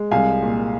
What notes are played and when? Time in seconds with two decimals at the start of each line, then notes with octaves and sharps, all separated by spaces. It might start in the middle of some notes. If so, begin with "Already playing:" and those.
Already playing: G#3
0.11 C2 F5 G#5
0.42 A#2